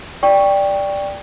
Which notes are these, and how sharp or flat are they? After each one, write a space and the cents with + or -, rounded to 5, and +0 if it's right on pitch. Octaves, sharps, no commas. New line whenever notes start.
D5 +0 G5 +10 C#6 +0